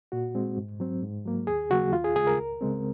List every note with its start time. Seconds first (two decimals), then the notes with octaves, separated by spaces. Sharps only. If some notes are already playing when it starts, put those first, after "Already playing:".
0.12 A#2 F#4
0.35 G#3 C4
0.58 G#2
0.80 F#3 C4
1.03 G#2
1.25 F#3 A#3
1.47 D#2 G#4
1.70 C#3 F#3 A#3 F#4
1.93 D#2 F4
2.04 G#4
2.15 C#3 G#3 G#4
2.27 A#4
2.38 C#2
2.61 C#3 G#3 C4